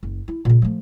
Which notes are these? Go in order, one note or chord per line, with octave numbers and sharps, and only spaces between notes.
F#1
E4
A#2 C#3
F3 A3